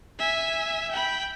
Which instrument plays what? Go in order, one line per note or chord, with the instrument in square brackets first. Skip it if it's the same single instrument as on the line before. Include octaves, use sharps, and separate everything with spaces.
[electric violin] E5 G#5
G5 B5